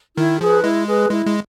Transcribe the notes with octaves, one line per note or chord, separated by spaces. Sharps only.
D#3 E4
F3 G#4 B4
G#3 E4
G#4 B4
G#3 E4
G#3